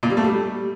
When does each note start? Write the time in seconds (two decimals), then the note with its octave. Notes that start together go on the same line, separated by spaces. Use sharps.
0.03 A#2
0.10 G3
0.17 A3
0.24 G3